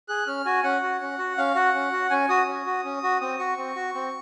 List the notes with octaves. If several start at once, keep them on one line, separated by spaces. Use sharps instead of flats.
G#4 F#6
C#4 F6
F#4 G#5
C#4 F#5
F#4
C#4
F#4
C#4 F5
F#4 F#5
C#4
F#4
C#4 G#5
F#4 D#6
C#4
F#4
C#4
F#4
C4 D#6
F#4 C#6
C4
F#4
C4